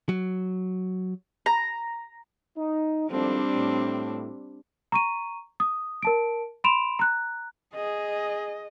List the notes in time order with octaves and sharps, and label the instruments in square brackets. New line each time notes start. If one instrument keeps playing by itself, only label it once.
[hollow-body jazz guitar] F#3
[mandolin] A#5
[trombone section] D#4
[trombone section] G#1 F3 A4 [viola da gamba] G3 C4 D4
[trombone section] A2
[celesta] A#5 C#6 D#7
D#6
A#4 A5 D7
B5 C6 D7 E7 F7
A#5 F#6
[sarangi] G#4 [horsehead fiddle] D#5